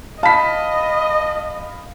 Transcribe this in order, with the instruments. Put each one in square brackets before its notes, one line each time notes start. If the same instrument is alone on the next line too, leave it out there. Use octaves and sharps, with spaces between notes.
[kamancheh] D#5 [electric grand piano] F5 B5 [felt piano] A5 B6